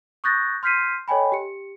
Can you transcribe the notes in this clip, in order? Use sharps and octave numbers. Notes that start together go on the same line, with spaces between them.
C#6 D#6 F#6 G6 A6 A#6
C6 F6 G6 B6 C7 D#7
A4 C#5 D#5 G5 G#5 B5
G4 C#7